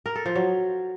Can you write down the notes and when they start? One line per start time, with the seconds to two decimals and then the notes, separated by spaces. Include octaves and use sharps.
0.06 A#4
0.16 A4
0.26 F3
0.35 F#3